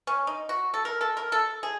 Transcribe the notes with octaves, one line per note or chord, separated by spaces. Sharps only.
C#4
D#4
F#4
A4
A#4
A4
A#4
A4
G#4